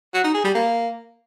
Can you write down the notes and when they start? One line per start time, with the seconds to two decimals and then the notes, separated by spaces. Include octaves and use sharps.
0.14 F#4
0.24 D#4
0.34 G#4
0.44 G3
0.55 A#3